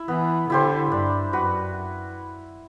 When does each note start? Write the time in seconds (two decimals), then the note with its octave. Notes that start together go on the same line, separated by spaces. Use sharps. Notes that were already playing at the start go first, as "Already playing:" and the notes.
Already playing: E4
0.08 E3 B3
0.50 D3 E4 G4 C5
0.92 G2 D4
1.33 F#2 F#4 B4